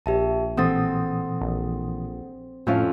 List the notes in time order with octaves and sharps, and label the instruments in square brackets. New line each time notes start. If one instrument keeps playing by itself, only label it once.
[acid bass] A#1 [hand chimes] G4 E5 A5
[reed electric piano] A#2 E3 D#6 [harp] C4 [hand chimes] A4 F#5 A6
[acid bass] A#1
[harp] F2 C#4 F4 [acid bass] A2